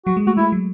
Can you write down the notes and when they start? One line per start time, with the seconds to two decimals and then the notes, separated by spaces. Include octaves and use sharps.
0.06 F#3 F#4
0.17 G#3
0.27 A3 F#4
0.37 G#3 E4
0.52 F#3